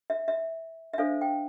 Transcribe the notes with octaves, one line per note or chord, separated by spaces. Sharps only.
E5
E5
E5
D4 A4 C5 F5
G5